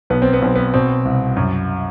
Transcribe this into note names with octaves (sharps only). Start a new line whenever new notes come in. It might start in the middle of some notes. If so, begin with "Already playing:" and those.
B1 B3
C4
B3
B1 C4
B3
B2 C4
C2
F#2